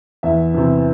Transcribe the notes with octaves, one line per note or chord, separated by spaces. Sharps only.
E2 E5
C3 E3